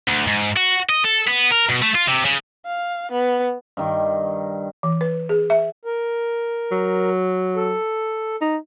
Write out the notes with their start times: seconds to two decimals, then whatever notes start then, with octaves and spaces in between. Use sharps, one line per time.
0.08 D2
0.28 G#2
0.56 F#4
0.90 D#5
1.04 A4
1.28 B3
1.52 A#4
1.70 B2
1.83 A3
1.95 F4
2.08 C3
2.25 C#3
2.66 F5
3.12 B3
3.77 G2 D#3
4.83 E3
5.01 B4
5.29 G#4
5.50 E5
5.85 A#4
6.72 F#3
7.56 A4
8.41 D#4